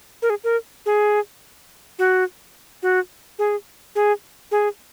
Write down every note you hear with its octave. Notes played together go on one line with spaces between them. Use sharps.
A#4
G#4
A#4
G#4
F#4
F#4
G#4
G#4
G#4